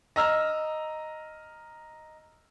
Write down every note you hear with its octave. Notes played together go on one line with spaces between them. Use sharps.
D#5 A#5 E6 F6